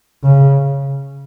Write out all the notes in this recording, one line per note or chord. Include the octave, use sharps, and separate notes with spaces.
C#3